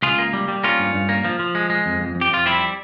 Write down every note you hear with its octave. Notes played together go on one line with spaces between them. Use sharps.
C#2 F4 G#4
A#3
G3
G3
A#3 C#4 F4
G2
G2
A#3
F3
F3
G#3
G#3
F2
F2
F2
G4
F2 F4
G3 C4 E4